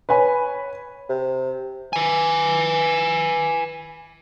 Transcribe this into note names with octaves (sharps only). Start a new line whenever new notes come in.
B4 C#5 G#5 B5
C3
B4 G#5